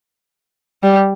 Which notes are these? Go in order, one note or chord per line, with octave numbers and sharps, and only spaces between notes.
G3